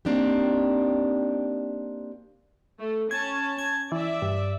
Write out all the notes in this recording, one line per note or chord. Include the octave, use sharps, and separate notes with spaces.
A#3 C4 D4 D#4 G4
A3
C#4 A5 G#6
G#6
E3 D5 E5
G2